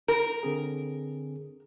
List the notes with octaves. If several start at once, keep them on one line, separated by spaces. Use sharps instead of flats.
A#4
D3 C4 G#4